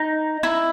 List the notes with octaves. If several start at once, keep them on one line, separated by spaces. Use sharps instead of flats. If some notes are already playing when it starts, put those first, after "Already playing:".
Already playing: D#4
E4